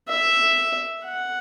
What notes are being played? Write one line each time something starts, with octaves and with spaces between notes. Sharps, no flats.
E5
F#5